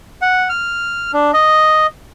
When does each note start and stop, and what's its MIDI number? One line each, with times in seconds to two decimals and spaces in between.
0.22 0.48 78
0.49 1.11 89
1.14 1.31 62
1.33 1.86 75